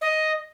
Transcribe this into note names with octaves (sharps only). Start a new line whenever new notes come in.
D#5